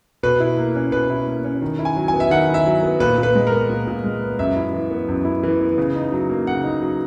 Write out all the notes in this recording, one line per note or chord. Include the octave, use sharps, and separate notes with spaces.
B2 B4
E4
A#3
C#4
B2 B4
E4
A#3
C#4
D#3
E4
G#5
F#3
G#5
B3
E5
D#3 F#5
E4
E5
F#3
B3
A#2 B4
A#2
B4
G#3
A#4
B3
A#2
A#2
G#3
B3
F#2 E5
E4
E3
B3
F#2
E4
E3
B3
C#3
D#4
F#3
A#3
C#3 F#5
D#4
F#3